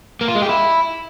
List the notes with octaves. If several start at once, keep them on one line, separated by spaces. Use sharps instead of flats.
A#3
F4
G#3
G4
E4